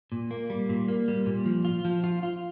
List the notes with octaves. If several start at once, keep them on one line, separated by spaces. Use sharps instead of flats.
A#2
A#3
G3
A#2
A#3
G3
A#2
F3
F4
F3
F4
F4